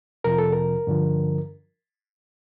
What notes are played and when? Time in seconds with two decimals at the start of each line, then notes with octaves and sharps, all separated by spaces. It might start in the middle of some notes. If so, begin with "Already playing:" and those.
0.24 F2 C3 F3 A#4
0.38 A4
0.52 A#4
0.87 G2 D3 F3